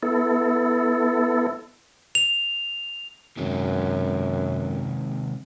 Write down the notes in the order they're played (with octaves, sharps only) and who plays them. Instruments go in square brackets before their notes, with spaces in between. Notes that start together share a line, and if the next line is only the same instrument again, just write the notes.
[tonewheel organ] B3 E4 A4
[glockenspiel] F7
[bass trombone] F#2 [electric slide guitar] C3 D#3 G#3